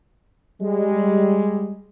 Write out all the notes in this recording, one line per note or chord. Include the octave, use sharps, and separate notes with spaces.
G3 G#3